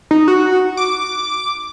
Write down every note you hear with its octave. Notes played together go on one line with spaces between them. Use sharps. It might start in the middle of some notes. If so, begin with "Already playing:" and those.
D#4
F#4
D6